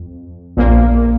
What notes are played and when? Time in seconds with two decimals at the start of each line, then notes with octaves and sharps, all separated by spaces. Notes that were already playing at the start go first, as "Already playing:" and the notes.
Already playing: F2
0.57 A#1 A#2 A#3